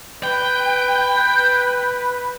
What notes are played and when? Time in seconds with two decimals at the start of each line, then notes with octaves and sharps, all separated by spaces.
0.23 B4 G5